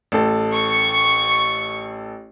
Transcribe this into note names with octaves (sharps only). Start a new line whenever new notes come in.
A1 A4
C#6